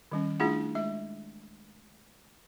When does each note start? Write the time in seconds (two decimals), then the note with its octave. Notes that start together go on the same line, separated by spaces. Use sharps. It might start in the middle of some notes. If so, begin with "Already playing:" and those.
0.11 D#3 G3 C#4
0.40 A3 D4 E4 F4 G#4 F#5
0.75 G#3 E5